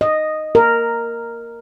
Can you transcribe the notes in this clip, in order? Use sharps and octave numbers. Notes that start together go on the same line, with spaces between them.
D#5
A#4